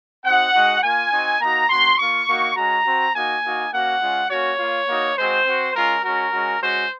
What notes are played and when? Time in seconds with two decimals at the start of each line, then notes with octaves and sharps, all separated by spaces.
0.24 C4 D#4 F#4 F#5
0.54 G#3 D#4 F#4
0.82 A#3 F4 G#5
1.11 C4 D#4 F#4
1.41 A#3 D#4 F#4 A#5
1.69 A#3 C#4 F#4 C6
1.98 A#3 F4 C#6
2.27 A#3 D#4 F#4
2.56 G#3 C#4 F#4 A#5
2.85 C4 F#4
3.14 A#3 D#4 F#4 G#5
3.43 A#3 D#4 F#4
3.72 A#3 C#4 F#4 F#5
4.01 G#3 C#4 F4
4.30 A#3 C#4 F#4 C#5
4.59 A#3 F4
4.88 A#3 D#4 F#4
5.17 G#3 C4 F#4 C5
5.46 C4 F#4
5.74 G#3 C#4 F4 A#4
6.03 G#3 C#4 F#4 A#4
6.33 G#3 C#4 F#4
6.61 G#3 C#4 F#4 C5